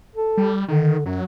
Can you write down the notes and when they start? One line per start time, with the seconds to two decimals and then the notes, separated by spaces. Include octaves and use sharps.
0.15 A4
0.37 G3
0.68 D3 D#3
1.06 F#2 F#3